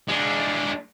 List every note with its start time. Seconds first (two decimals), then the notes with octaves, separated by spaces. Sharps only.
0.09 G#3 D4